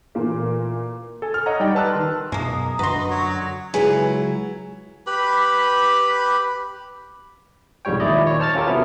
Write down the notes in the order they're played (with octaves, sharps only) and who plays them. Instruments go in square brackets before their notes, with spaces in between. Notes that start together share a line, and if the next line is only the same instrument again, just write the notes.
[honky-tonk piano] A#2 E3 A3 A#3
[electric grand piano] A4 G#5
F6
C#5 D#5 F#5 A#5
G3 D#4 D5 G5
B4 A5 E6 F#6
D#3 C6
[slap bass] F#2 B2 [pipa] G#3 A#3 [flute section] A#5 D#6
[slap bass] F#2 D3 [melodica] F#4 D#5 [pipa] B4 C6
[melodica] F#3 F#4 C#5
[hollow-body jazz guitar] C#2 G#5 [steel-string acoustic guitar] F#3 E4 [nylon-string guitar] G#4 B4
[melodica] G4 B4 B5
[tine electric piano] B1 F2 G#2 G3 C#5 G5
D#2 A#2 E4 D5 D#5
D#2 C#5
C5 A5 F6 A6
C#4 F4 G4 A4 A#4 C#5
C3 F#3 B3 C#4 E4